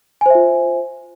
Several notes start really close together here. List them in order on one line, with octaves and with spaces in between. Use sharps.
G#5 C5 E5 F4